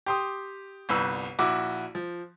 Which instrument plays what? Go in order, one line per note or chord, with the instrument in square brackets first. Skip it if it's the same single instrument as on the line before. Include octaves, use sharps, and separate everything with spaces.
[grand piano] G4 C6 D#6
G1 C2 B4 E6
A#1 E4 F#4 D6
F3